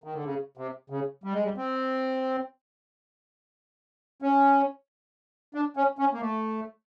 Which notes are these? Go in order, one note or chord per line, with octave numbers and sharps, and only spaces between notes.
D#3
D3
C#3
C3
C#3
G3
G#3
G3
C4
C#4
D4
C#4
C#4
A#3
A3